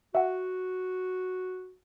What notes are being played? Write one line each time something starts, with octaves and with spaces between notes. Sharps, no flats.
F#4 E5 F#5